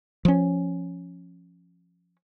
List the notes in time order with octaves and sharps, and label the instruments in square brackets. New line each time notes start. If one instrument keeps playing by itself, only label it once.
[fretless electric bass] F3 C#4